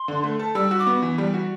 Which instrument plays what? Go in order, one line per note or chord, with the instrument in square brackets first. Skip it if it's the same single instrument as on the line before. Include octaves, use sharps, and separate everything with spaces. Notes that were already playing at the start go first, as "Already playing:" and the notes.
Already playing: [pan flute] C6
[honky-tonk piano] D3
A3
A4
[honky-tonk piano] G3 [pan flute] E6
[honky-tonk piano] F#4
[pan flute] D6
[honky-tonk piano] B3
E3
G3
F#4